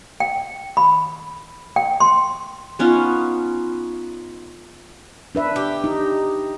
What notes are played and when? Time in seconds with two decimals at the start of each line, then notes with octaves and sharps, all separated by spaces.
0.20 G5
0.77 B5
1.76 G5
2.00 C6
2.79 B3 C#4 D#4 F4
5.35 D4 B4 E5
5.56 G4
5.84 D#4